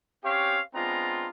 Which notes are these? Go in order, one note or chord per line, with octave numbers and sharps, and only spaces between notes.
C4 C#4 G4 C#5 F5
G#3 B3 C4 D4 F4 A#5